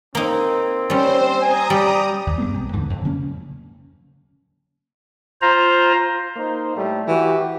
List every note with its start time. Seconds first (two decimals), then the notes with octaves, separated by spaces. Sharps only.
0.15 A#3 C4 D#4
0.90 G3 C#4 C5
1.41 G#5 A#5 D#6
1.70 G3 G4
2.27 D#2
2.38 G2 G#3 B3 C4
2.54 B1
2.73 D#2 G#2 D3 E3
2.90 F2
3.04 C#3 F#3 A#3 C#4
5.42 F4 C5 A#5
6.37 A#3 D#4 C5
6.76 A2 G3 A3
7.08 E3 F#4 G4